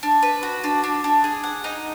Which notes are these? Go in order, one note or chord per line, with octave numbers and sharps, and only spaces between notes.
D4
B4
F#4
D4
D4
D4
G#4
F#5
D#4